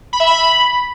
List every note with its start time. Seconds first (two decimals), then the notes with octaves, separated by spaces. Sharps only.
0.13 B5
0.20 E5
0.27 B5